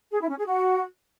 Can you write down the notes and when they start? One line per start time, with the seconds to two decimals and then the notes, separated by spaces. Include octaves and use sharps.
0.11 G#4
0.20 E4
0.29 C#4
0.38 G#4
0.47 F#4